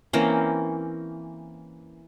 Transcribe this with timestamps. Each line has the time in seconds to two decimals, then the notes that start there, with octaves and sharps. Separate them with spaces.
0.13 E3 A#3 C4 C#4